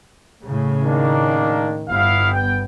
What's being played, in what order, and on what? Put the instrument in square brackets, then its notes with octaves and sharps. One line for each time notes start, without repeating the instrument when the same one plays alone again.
[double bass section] A2 C#3
[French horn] D#3 [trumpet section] A#3 D4
[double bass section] G1 [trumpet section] B3 E4 F5
[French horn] B3 [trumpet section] G5